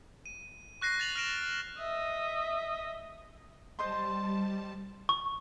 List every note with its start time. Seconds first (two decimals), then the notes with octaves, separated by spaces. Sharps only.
0.26 D#7
0.81 C#6 F#6 A#6 C7
0.99 A6 F7 F#7
1.16 F6 A#6 D7 E7 F#7
1.79 D#5 E5
3.79 G3 C5 D#5 A5 C6
5.09 C#6